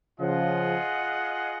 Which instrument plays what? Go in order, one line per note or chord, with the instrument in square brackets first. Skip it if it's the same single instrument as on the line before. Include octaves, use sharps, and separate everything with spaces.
[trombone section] C#3 F3 [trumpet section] F4 G#4 D#5 F#5